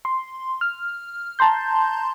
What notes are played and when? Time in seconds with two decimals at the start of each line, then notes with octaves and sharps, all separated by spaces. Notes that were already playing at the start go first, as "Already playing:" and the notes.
0.05 C6
0.61 F6
1.39 A5 A#5 C6 G6